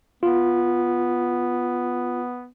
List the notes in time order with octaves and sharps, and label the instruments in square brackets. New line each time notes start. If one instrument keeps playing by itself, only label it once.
[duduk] B3 [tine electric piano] F4